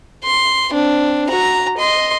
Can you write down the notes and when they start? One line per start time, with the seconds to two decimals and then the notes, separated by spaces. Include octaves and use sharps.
0.25 C6
0.70 C4 D4
1.29 F#4 A#5
1.78 D#5 C6